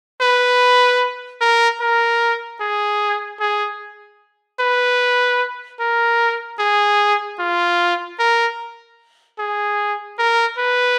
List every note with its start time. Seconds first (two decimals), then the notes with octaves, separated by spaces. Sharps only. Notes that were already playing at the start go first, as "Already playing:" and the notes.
0.21 B4
1.41 A#4
1.81 A#4
2.61 G#4
3.40 G#4
4.60 B4
5.80 A#4
6.59 G#4
7.39 F4
8.19 A#4
9.39 G#4
10.19 A#4
10.58 B4